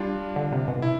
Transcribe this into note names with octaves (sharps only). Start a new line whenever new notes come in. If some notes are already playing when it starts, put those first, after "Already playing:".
Already playing: G3 D4 F4
D3
C3
B2
E4